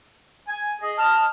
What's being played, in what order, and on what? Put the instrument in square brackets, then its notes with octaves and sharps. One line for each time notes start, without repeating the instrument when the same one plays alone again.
[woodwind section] G#5
G#4 D#5
[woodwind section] D#5 F6 [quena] A5